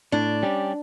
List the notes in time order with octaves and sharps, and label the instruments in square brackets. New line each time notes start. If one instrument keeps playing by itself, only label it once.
[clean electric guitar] A2 [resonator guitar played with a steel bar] D4
[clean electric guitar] G3 C#4 G4